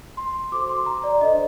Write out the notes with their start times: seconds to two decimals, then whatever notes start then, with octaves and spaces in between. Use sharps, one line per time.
0.17 C6
0.52 F#4 A4 C5 D6
0.69 C6
0.86 A#5
1.04 D5
1.21 D4 A4 C5 D#5